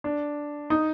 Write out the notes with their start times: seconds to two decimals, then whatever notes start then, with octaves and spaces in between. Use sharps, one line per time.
0.04 D4
0.70 D#4